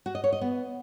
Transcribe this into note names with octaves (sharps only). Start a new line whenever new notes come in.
F#4
D#5
C#5
D#5
B3